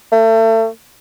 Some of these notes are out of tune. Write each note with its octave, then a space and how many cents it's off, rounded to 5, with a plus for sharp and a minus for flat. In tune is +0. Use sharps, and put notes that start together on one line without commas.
A3 +35